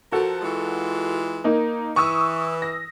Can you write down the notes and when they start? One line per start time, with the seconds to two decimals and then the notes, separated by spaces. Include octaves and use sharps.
0.12 F3 F#4 A4 A#4
0.42 E3 G#3 F4
1.44 A#3 D#4
1.96 E3 C#6 D#6 E6
2.62 A#6